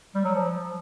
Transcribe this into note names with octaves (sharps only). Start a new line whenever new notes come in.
G3
F#3
F3